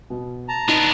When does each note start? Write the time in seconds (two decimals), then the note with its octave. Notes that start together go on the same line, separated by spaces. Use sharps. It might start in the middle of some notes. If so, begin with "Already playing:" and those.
0.10 B2
0.49 A5 A#5
0.68 B3 D4 D#4